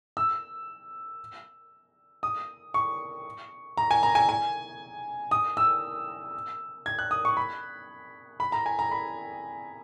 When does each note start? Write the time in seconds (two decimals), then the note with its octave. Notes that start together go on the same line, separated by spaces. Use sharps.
0.17 E6
2.23 D#6
2.74 C#6
3.77 A#5
3.91 G#5
4.03 A#5
4.15 G#5
4.29 G#5
5.31 D#6
5.57 E6
6.86 G#6
6.99 F#6
7.11 D#6
7.25 C#6
7.37 B5
8.40 B5
8.52 A#5
8.66 G#5
8.79 A#5
8.91 B5